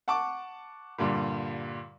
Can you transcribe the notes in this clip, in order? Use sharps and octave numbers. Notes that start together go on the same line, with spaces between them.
F#5 A5 C#6 D6
G2 A#2 D3 G3